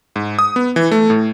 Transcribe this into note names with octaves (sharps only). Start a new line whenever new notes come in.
G#2
D#6
B3
E3
A3
A2